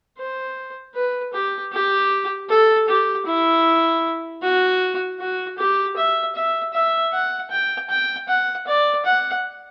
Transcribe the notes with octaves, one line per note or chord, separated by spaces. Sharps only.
C5
B4
G4
G4
A4
G4
E4
F#4
F#4
G4
E5
E5
E5
F#5
G5
G5
F#5
D5
F#5